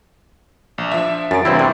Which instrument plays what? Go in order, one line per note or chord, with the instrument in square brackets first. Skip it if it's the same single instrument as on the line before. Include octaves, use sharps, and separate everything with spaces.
[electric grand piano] A#1
F3 D4 E5
[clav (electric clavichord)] F#2 [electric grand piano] A6 D7
[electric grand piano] E2 C3 [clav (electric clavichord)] G2 C4 E4
[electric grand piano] G2 [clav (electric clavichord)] C3